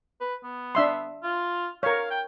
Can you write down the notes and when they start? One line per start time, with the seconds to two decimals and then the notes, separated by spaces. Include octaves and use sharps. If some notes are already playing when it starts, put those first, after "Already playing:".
0.21 B4
0.44 B3
0.75 D4 E5 C6
1.24 F4
1.83 A#4 C#5 F5
2.11 G5